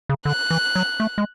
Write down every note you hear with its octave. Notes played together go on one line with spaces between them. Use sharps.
C#3
D3 F#6
E3
F#3
A3
G#3